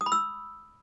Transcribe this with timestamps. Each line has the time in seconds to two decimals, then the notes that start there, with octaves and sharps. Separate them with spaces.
0.01 D#6
0.06 B5
0.12 E6